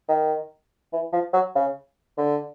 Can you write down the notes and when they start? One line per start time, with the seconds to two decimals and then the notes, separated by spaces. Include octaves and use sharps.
0.08 D#3
0.93 E3
1.12 F3
1.33 F#3
1.55 C#3
2.18 D3